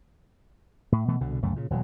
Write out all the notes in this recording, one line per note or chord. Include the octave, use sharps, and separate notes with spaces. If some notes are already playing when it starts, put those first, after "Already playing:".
A2
B2 E3 A3
C2 B2 D3
G1 C#2 F#2 A3
A#2 C#3
D#1 B2 E3 F#3